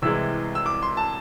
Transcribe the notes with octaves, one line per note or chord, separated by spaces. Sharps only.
C2 C3 E3 G#3 E6
E6
D6
C6
A5